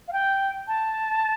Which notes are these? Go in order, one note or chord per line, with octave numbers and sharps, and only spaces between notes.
F5
G5
A5